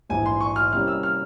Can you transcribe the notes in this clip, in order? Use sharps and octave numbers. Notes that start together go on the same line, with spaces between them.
A#1 G#2 E3 G#5
C6
C#6
F6
C3 G3 A#3 C#4 E4 F6
E6
F6